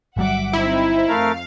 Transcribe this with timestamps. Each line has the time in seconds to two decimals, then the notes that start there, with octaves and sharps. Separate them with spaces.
0.17 G1 F#3 G3 E5 F#5 D6
0.53 C4 D#4 E4
1.09 F2 A3 A#4 F5